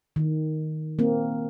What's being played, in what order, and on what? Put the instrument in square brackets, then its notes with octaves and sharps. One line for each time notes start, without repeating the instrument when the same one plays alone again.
[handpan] D#3
A#3 C4